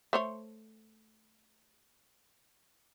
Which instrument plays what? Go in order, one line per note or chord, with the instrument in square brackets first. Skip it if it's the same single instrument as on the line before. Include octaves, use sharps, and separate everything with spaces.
[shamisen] A3 C5 C#5